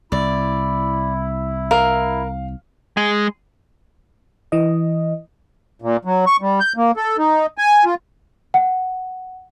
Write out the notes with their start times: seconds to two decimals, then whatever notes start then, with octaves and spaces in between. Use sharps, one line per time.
0.12 C2 E4 D5
1.71 A#4 F5
2.97 G#3
4.52 E3 D#5
5.82 A#2
6.05 F#3
6.27 C#6
6.41 G3
6.60 G6
6.77 A#3
6.97 A4
7.19 D#4
7.58 G#5
7.85 F4
8.54 F#5